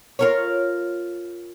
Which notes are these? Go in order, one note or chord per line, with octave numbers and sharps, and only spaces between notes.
F4 A#4 C#5